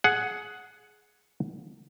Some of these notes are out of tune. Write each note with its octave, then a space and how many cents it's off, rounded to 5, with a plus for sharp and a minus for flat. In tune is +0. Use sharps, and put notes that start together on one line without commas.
G#4 +15 F#5 +0